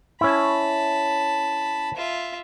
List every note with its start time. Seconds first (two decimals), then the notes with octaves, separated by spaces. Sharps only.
0.21 C#4 E4 A5 B5
1.96 F4 E5